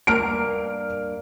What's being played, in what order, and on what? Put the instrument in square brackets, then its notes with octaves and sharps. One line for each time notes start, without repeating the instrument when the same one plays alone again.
[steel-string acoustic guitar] G2 A#3 A#5 [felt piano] F6 D7